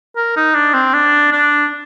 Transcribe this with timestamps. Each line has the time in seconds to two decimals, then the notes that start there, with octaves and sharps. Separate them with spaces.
0.16 A#4
0.37 D#4
0.55 D4
0.74 C4
0.94 D4
1.32 D4